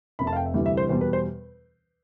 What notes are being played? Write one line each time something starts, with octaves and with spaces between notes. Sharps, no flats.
F1 F2 C3 B5
A5
F5
G5
E5
D2 C3 E3 G3
E5
C5
E2 B2 G3 C5
B4
C5